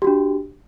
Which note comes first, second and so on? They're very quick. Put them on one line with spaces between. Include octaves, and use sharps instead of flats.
G4 F#4 D4